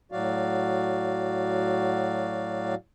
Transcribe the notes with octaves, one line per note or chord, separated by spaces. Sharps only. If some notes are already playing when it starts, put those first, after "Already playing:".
A2 F#3 F#4 D5 F5